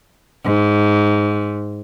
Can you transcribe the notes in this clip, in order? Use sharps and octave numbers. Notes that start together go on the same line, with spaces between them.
G#2